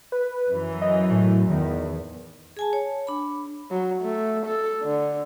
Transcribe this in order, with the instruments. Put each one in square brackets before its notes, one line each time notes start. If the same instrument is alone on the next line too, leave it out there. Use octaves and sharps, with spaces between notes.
[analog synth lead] B4
[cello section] F#2 E3
[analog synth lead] D#5
A2
[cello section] E2 [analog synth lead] D#3
[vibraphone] G#4 G#5 A5
C#5
D4 B5
[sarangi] F#3
A3
A4
D3